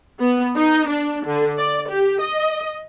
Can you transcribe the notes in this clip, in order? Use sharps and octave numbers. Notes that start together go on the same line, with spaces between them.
B3
D#4
D4
D3
D5
G4
D#5